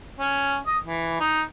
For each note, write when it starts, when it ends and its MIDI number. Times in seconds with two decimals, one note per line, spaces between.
0.19 0.56 61
0.66 0.77 75
0.83 1.15 52
1.20 1.41 63